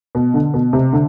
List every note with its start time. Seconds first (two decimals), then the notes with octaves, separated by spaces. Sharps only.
0.15 B2
0.34 D3
0.54 B2
0.73 C3
0.93 D3